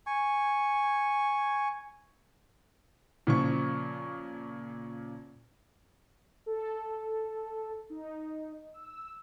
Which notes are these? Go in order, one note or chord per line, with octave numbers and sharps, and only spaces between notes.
G#5 C#6
A#2 C#3 F3 C#6
A4
D#4
E6